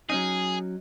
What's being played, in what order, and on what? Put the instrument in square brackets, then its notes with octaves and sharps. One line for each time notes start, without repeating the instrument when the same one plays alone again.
[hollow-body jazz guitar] F#3 C#4 D#4 [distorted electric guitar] G#4